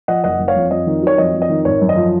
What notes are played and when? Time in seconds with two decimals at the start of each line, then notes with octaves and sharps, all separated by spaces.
0.08 F3 D#5 F#5
0.24 F#1 D#5 F#5
0.40 F#1
0.48 C#5 F5
0.56 F2
0.71 F2 D#5
0.87 D#3
1.02 F#3 C#5
1.18 F2 D#5
1.34 F2
1.42 D#5
1.49 D#3
1.65 G#1 C#5
1.81 F#2
1.89 D#5
1.97 F3